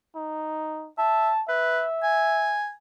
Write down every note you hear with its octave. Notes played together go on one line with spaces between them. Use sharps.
D#4
E5 A5
B4 E5
G#5